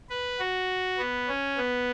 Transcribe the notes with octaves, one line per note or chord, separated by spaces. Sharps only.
B4
F#4
B3
C#4
B3